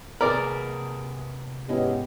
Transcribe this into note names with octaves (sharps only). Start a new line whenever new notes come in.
C3 C4 G#4 A#4 B4 D5
G#2 B3 C#4 E4 G4 D#5